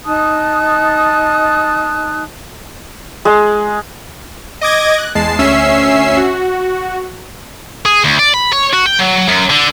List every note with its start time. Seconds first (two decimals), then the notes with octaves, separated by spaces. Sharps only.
0.06 D#4 A5 D#6 F#6
3.25 G#3
4.61 D#5 D6 G#6 A#6
4.98 F#6
5.15 E2 G#3 A5 C7
5.39 D2 C#4 E5 E6 C7
6.17 F#4
7.85 G#4
8.04 D2
8.19 D5
8.34 B5
8.52 C#5
8.73 F#4
8.86 G5
8.99 F#3
9.28 F#2
9.50 D3